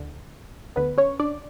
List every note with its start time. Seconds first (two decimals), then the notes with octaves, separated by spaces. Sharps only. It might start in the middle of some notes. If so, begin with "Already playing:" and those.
Already playing: D2 D3
0.76 D2 D3 B3 B4
0.98 C#4 C#5
1.20 D4 D5